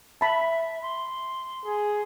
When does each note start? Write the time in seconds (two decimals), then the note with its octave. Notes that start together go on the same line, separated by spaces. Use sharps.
0.21 E5 A5 B5
0.82 C6
1.66 G#4